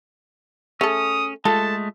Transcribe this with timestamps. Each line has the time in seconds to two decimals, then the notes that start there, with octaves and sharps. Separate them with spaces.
0.81 A3 C#4 G#4 A4 D#6
1.45 G#3 A3 F4 A4 A5